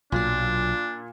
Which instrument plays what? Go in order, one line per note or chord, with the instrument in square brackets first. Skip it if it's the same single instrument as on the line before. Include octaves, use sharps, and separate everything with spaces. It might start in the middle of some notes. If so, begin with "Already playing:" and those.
[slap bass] B1 F#3 [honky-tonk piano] A#2 [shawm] D4